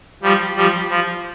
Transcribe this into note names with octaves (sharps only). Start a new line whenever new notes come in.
F3 G3
F3 G3
F3